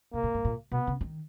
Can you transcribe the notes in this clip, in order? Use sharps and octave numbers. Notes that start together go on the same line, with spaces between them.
B2 A#3
A#2
G#2
A#2
B2 B3
C#3
D#3